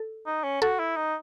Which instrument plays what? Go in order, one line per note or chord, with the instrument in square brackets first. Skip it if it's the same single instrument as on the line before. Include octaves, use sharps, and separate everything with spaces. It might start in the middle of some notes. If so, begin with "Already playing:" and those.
Already playing: [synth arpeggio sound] A4
[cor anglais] D#4
C#4
[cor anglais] F#4 [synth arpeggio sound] A4
[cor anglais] E4
D#4